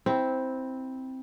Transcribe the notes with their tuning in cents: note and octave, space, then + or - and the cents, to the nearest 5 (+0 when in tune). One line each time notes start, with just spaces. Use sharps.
C4 +0 E4 -20